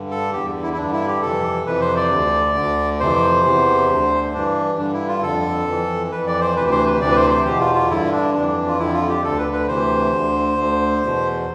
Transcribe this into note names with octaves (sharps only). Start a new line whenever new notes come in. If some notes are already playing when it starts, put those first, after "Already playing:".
Already playing: G2 D3
A4
E2 D3 G4
E4
E4
G2 D3 D4
E4
G4
F2 C3 E3 A4
F2 C3 E3 B4
C5
D5
D2 D3
D2 D3
F2 C3 E3 C5
E2 C3 E3
D2 D3
G2 E3 D4
G2 D3 D4
E4
F4
F2 D3 A4
F2 E3
F2 E3 B4
D5
C5
D2 C3 E3 B4
C5
B4
D2 C3 E3 D5
B4
C5
C5
E2 B2 G4
F4
F4
G2 D3 E4
D4
F2 E3 D4
F4
F2 D3 E4
F4
G4
D2 D3 A4
B4
B4
D2 C3 E3 C5
D2 D3
D2 D3
E2 B2